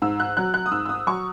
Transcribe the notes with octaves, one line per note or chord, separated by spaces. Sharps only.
G#2 E6
F#6
F#3 F#6
F#6
D#6
G#2 E6
E6
D#6
F#3 C#6